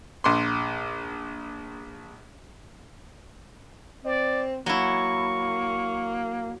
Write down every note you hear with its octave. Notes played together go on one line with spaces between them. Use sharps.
A#1 C6
C4 D5
F#3 A#3 E4 C#6